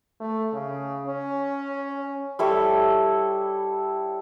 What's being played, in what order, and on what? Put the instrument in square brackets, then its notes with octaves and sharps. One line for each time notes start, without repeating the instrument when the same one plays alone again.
[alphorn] A3
C#3
C#4
[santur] G3 E4 A4 C#5